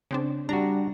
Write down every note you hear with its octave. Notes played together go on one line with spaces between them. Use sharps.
C#3 C4 D4
G3 D4 F#4 A#5